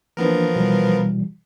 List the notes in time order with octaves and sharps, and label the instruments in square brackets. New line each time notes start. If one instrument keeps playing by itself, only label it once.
[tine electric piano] E3 A#3 D4 [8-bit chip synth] F3 B3 A#4
[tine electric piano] B2 E3 G3